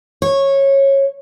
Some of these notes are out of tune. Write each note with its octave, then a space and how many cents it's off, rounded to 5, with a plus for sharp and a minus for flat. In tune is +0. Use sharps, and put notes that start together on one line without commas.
C#5 -15